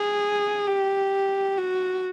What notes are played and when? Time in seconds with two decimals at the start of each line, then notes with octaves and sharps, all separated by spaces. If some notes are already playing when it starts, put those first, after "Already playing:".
Already playing: G#4
0.67 G4
1.57 F#4